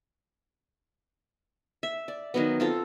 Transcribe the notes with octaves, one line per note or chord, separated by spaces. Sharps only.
E5
D5
D#3 F#3 B3
C4 F4 A4